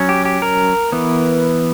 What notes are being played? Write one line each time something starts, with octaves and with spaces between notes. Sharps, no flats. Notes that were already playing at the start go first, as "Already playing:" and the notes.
Already playing: F#3 C#4
G4
G4
A#4
E3 B3